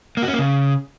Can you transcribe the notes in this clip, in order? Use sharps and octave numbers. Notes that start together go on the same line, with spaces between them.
A#3
F#4
C#4
A#3
C#3